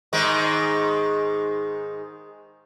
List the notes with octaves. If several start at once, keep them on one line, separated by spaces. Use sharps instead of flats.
G#2 D#3 G#3